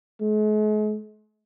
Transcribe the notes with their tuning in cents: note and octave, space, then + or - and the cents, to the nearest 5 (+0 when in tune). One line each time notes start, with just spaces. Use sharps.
G#3 +45